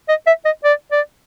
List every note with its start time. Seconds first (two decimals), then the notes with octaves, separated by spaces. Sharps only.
0.08 D#5
0.26 E5
0.45 D#5
0.64 D5
0.92 D5